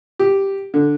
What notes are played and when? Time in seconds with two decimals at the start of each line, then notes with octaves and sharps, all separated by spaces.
0.19 G4
0.74 D3